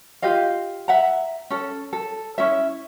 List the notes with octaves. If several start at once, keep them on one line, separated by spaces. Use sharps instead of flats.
F4 G4 D#5 F5
E5 F#5 A#5
C#4 A4
A4
C#4 E4 E5